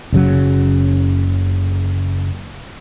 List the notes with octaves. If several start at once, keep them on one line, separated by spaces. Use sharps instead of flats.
F#1 C#3 F#3